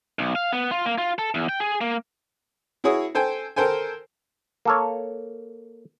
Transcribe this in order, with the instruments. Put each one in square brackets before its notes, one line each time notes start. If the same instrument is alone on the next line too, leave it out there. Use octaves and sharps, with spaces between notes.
[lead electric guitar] B1
F5
B3
F4
A#3
F4
A4
E2
G5
G#4
A#3
[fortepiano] E4 F#4 G#4 C#5 D#6
A4 C5 G5 G#5
A4 A#4 C5 G5 G#5
[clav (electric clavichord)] A#3 A4 C#5